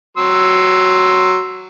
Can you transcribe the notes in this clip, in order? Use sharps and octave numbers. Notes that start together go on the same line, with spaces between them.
F#3 C6 E6